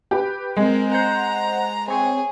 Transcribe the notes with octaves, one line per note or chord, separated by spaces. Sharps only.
G4 B4
G#3 C4 A#4
C5 F#5 A#5
C4 G#4 C#5